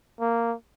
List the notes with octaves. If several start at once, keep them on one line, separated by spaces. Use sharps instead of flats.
A#3